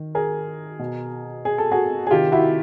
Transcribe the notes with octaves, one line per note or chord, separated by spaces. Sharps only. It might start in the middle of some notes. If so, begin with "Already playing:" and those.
Already playing: D#3
G#4 A#4
B2
G#4
A4
F#4 G#4
G#4
C3 D#3 F4 G4
E4 F#4